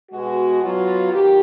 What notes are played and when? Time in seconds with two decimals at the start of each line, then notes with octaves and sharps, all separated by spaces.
0.11 B2 G#3 F#4
0.61 B2 F#3 F4
1.11 D#3 G4